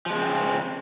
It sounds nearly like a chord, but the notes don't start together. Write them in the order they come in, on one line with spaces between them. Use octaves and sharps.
F3 G#3 C#3 C4